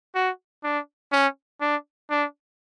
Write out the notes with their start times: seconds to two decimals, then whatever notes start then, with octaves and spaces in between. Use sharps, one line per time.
0.15 F#4
0.64 D4
1.12 C#4
1.61 D4
2.10 D4